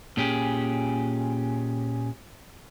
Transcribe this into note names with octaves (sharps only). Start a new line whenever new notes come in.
A#2 C#4 G4 G#4